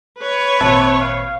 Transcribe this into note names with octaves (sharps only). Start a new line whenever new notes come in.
B4 C#5
G#1 A#2 C4 E5 A5
F5